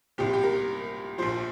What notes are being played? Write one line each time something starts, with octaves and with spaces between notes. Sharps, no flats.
C2 A#2 F3 G4
G4
A#4
A#1 A#2 F3 C5